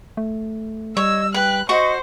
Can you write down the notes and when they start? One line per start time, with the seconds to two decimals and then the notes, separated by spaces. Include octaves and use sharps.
0.17 A3
0.97 G3 C#5 D#5 E6
1.34 B4 G5 F#6
1.69 F#4 C5 D#5 C#6